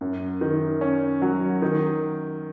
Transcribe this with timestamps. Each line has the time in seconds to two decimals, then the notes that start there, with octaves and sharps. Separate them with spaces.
0.01 F#2
0.41 D#3
0.81 C#4
1.22 F#3
1.62 D#3